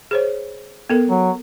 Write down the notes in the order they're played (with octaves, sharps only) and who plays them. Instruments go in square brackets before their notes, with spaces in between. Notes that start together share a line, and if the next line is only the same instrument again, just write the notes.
[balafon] G#4 C5 C#5
B3 A4 A#4
[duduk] F#3